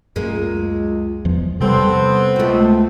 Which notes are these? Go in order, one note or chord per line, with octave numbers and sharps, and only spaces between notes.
C#2 F#2 G#3 A#3
E2 F3
C3 G3 B3 C4 A4
C#2 A3 F#4